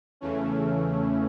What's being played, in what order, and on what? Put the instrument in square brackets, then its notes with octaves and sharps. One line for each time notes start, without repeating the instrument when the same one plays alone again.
[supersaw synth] E2 C#3 E3 A3 C#4